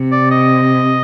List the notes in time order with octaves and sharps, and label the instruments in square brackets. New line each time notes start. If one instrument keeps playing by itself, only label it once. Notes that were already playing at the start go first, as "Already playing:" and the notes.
Already playing: [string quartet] C3
[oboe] D5
D#5